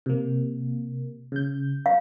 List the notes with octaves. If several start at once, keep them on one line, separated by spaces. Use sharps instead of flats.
C3 A#3
C#3 G6
F5